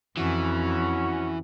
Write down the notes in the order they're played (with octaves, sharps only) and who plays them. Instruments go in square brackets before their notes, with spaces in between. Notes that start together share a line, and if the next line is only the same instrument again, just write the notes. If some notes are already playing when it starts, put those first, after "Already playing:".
[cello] F2 [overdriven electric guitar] E3 [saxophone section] C#4 F#4